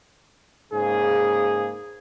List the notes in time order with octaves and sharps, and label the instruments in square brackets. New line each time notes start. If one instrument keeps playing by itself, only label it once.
[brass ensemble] G#2 C#3 A#3 G#4